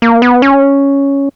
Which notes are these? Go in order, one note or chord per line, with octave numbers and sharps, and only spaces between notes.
A#3
B3
C#4